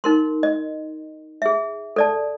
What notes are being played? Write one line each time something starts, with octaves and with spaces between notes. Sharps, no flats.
D#4 A#4 C6
D#5
G#4 E5
A4 D5 A5